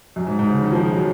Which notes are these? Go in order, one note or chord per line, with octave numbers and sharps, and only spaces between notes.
F#2
G#2
G#2
C#3
D#3
F3
G#3
F#3